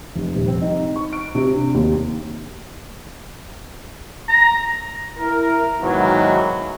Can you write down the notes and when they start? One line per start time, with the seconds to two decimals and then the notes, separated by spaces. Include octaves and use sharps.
0.15 F1
0.35 D#1
0.48 C4
0.62 D#4
0.96 C#6
1.13 D7
1.35 C3
1.52 D4
1.74 D#2
4.28 A#5
5.19 E4 A#4
5.81 G#2 B2 D#3 E3 F#3